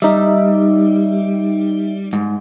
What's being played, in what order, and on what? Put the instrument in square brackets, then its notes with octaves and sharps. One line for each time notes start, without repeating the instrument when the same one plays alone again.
[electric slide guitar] G3 [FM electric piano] D#4 E5
[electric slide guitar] G#2